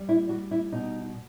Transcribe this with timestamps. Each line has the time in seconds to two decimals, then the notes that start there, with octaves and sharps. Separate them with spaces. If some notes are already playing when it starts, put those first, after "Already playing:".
Already playing: G3
0.09 E4
0.29 G3 F#4
0.51 E4
0.72 B2 D#4